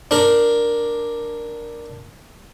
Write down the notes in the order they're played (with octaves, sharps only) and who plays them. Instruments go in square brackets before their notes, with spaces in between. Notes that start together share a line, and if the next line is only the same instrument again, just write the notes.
[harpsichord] D4 A#4